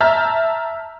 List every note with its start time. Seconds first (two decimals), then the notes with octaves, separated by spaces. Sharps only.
0.01 E5 A5 A#5 F6 G6